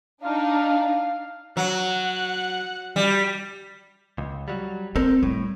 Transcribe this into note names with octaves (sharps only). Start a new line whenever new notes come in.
D4 D#4 F5
F#3 F#5
G3
C#2
F#3 G3
C4 A4 A#4 C5
A2 G3